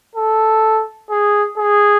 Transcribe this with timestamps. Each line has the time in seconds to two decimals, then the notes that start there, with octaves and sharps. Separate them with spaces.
0.15 A4
1.10 G#4
1.58 G#4